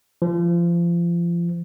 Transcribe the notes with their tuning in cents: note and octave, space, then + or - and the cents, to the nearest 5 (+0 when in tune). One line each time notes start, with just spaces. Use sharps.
F3 -30